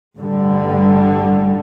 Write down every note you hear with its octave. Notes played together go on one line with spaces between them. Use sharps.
A1 G2 D3 G3